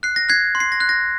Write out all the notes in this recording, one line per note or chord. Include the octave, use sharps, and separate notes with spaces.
F#6 C7
A#6
F#6 G#6 C7
C6
C7
A#6
F#6
A#6